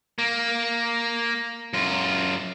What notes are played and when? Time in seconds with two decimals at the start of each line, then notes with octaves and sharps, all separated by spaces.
0.19 A#3
1.73 F#2 F4